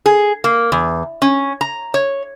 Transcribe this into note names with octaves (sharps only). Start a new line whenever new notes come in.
G#4
A#3
E2
C#4
A#5
C#5